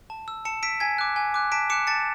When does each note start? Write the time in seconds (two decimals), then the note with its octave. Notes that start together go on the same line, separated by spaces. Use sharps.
0.10 A5
0.28 E6
0.45 A5 C#7 E7
0.63 E6 B6 D7
0.80 G#5 G#6 B6
0.98 D6 F#6
1.16 G#5
1.34 D6 F#6
1.52 A5 B6 D7
1.70 D6 F#6 C#7 E7
1.87 A5 A6 C#7